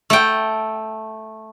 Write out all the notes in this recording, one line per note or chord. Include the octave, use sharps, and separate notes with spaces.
A3 G5